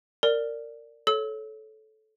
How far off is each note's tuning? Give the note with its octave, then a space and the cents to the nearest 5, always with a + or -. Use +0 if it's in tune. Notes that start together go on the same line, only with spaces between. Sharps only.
A#4 -20 D5 +0
A4 -15 C#5 +0 E6 -35